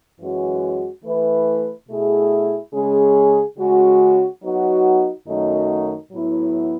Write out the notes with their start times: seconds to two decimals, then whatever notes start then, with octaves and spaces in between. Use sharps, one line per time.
0.20 F#2 E3 G#3 C#4 F#4
1.04 E3 A3 E4 B4
1.88 B2 A3 E4 G#4
2.73 C#3 G#3 C#4 G#4
3.58 C#3 G#3 C#4 F#4
4.42 F#3 B3 D#4 F#4
5.27 F#2 D#3 F#3 A3 D#4
6.12 A2 F#3 B3 E4